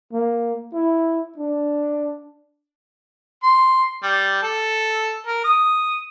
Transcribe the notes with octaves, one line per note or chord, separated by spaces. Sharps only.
A#3
E4
D4
C6
G3
A4
A#4
D#6